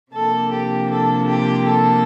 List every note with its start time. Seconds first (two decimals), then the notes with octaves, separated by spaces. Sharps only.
0.12 C3 F3 A#3 D4 A4
0.50 G4
0.88 A4
1.26 G4
1.64 A4